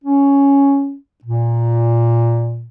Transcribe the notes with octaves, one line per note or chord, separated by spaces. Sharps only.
C#4
A#2